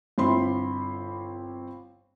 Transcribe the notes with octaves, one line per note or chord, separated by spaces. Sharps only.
G1 C4 E4 B5 C6